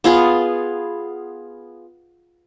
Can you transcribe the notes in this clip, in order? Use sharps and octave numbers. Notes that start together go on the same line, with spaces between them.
B3 F4 G#4